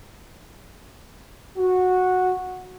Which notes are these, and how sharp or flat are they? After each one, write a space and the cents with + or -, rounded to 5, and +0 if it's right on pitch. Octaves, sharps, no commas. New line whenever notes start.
F#4 -10